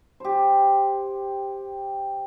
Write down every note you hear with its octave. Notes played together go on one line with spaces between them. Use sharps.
G4 C5